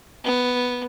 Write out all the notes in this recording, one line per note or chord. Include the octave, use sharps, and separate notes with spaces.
B3